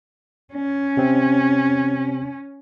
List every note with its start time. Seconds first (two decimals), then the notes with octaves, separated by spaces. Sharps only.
0.54 C#4
0.97 C3 C4